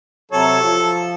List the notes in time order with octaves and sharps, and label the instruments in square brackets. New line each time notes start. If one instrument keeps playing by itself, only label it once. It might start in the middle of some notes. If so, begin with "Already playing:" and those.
[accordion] C3 F#3 C#5 [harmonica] A4
[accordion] F3